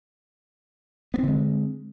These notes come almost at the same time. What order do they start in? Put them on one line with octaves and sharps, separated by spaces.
B3 C4 D3 G#3